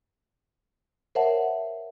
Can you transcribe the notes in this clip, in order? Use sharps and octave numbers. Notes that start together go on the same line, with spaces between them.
A#4 C5 C#5 E5 F#5 A5